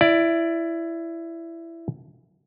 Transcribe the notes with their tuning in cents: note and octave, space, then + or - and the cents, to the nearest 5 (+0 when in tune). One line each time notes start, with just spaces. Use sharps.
E4 +15 D5 +0